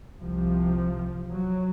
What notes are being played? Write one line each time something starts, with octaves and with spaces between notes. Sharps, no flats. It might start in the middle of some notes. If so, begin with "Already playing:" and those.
C2 C3 F3
F#3